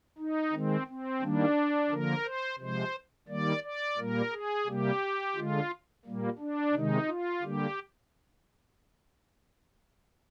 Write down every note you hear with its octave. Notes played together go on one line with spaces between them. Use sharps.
D#4
D#3 G#3 C4
C4
D#3 G3 A#3 D4
D3 F3 A#3 A#4
C5
C3 F3 G#3 C5
D#3 G3 A#3 D5
D5
A#2 G3 A#3 A#4
G#4
C3 G3 A#3 G4
D3 G#3 F4
A#2 G3 A#3
D4
C3 D#3 G#3 D#4
F4
D3 G3 A#3 G4